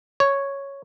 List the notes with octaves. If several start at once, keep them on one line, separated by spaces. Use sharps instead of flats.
C#5